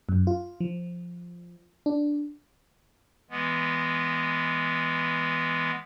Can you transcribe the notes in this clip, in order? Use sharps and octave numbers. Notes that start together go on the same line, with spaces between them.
F#2
F4
F3
D4
E3 G#3 B3